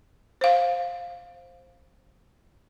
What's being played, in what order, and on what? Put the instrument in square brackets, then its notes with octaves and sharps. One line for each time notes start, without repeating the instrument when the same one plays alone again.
[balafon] C5 F5